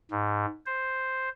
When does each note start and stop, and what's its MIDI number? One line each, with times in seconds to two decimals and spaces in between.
0.11 0.46 44
0.66 1.29 72